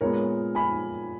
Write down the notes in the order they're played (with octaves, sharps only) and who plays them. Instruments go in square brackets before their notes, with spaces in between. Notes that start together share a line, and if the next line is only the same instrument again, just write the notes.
[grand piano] A#2 G#3 B3 A#4 C#5
G#5 B5